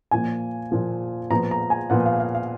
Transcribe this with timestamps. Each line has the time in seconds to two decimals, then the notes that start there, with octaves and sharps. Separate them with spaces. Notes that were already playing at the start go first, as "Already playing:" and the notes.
0.11 A#2 F3 A#3 G#5
0.71 A#2 F3 A#3
1.30 A#2 F3 B3 A#5
1.51 A#5
1.70 G#5
1.90 A#2 F3 B3 F#5
2.06 F5
2.20 F5
2.35 F5